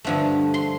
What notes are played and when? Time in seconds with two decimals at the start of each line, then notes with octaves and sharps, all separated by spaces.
0.04 G2 D3 F3 A3
0.54 C6